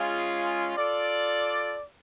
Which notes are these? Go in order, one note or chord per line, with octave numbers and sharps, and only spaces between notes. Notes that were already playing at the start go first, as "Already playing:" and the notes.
Already playing: G#3 C#4 F4 G#4
F4 A4 D5